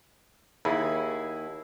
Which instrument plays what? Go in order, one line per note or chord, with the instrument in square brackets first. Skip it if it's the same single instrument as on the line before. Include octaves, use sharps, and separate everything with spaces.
[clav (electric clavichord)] D#2 [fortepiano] E4 G#4 B5